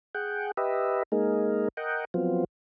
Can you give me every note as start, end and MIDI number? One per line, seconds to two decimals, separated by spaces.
0.15 0.51 68
0.15 0.51 78
0.15 0.51 79
0.57 1.03 67
0.57 1.03 71
0.57 1.03 75
0.57 1.03 76
1.12 1.68 56
1.12 1.68 58
1.12 1.68 63
1.12 1.68 68
1.12 1.68 70
1.77 2.05 70
1.77 2.05 75
1.77 2.05 78
1.77 2.05 79
2.14 2.44 53
2.14 2.44 54
2.14 2.44 59
2.14 2.44 60
2.14 2.44 65